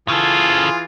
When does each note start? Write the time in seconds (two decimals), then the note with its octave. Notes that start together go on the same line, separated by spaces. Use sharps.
0.08 C#3 E3 F4 G#4 A4